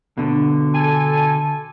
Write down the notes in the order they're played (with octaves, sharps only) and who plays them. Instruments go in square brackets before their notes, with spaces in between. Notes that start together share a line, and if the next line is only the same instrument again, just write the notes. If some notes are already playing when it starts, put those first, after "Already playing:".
[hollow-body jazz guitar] B2 D3
[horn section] A4 G#5